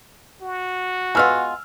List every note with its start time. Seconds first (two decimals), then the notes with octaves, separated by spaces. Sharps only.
0.42 F#4
1.15 G#3 B3 F4 G#5 E6 F6